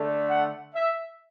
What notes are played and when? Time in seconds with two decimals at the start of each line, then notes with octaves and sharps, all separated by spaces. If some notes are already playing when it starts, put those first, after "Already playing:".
Already playing: D3 A3
0.28 F#5
0.74 E5